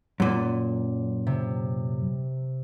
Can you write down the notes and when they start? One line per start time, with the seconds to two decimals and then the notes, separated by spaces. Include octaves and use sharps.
0.20 F#2 A#2
1.27 C3